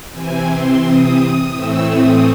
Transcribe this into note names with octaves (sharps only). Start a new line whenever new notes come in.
C3 E3 C4 G#5
C6
D#6
A2 E3 A3 C4 E6
D#6